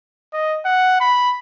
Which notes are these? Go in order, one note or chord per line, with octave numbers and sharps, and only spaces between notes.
D#5
F#5
B5